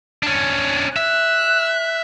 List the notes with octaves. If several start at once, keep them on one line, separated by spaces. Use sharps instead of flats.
C#4 D4
E5 F#6